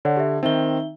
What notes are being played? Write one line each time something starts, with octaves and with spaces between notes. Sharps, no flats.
D3 C#5 D5 F#5
G4 E5
D#3 C4 D#4 E5 G7